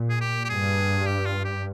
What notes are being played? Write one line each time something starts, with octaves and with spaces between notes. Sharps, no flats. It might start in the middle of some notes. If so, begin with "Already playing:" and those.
Already playing: A#2
G#4
G4
G4
G2 G#4
G4
F4
G4